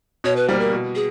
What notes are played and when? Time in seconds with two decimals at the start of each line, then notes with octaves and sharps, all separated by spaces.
0.24 B2 C#5
0.36 B4
0.49 G3 A#3 C5
0.60 A#4
0.73 B2
0.95 G#4